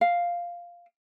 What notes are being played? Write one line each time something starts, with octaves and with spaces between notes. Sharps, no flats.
F5